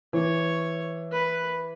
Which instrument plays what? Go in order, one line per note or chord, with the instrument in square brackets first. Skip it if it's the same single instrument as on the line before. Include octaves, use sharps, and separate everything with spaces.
[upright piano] E3 [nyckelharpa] C#5
[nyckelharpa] B4